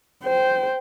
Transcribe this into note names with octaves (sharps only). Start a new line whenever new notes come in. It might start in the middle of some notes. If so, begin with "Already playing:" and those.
C5 G5